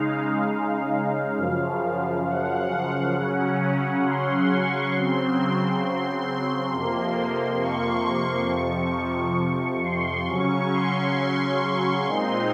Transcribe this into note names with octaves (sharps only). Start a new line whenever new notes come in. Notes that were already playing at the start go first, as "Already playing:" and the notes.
Already playing: C#3 G#3 D#4 F5
F#2 C#3 F3
F#5
C#3 F#3 C#4
C6
C#6
C#3 F#3 C4 C6
C6
F2 C3 F3 A#3
C#6
F2 C3 F3
C6
C#3 F#3 C#4 C#6
C6
A#2 G#3 C4 D#4